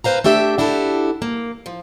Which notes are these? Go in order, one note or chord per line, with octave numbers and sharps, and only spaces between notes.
G#2 B4 C5 F5 A#5
A3 D4 G4 E5
D4 E4 F#4 G4 A4
A#3
F3